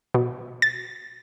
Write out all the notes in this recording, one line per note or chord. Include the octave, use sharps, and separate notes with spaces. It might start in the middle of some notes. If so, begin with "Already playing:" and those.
B2
A6